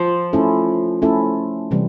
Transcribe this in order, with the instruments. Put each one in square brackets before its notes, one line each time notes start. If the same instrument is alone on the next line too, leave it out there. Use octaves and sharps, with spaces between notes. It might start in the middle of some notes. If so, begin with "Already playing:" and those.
Already playing: [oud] F3
[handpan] A3 C#4 E4 A4
A3 C#4 E4 A4
C3 E3 G3